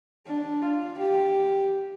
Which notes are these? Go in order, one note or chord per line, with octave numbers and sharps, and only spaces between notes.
D4
F4
G4